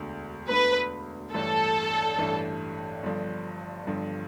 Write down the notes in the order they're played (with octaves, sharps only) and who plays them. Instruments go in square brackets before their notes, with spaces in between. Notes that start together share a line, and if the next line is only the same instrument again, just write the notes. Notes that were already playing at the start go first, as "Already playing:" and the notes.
Already playing: [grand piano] E1 D2 D3
[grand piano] E1 D2 D3 [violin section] B4
[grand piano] A1 G2 E3 A3 D4 [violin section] A4
[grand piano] A1 G2 E3 A3 D4
G1 G2 D3 F3
G1 G2 D3 F3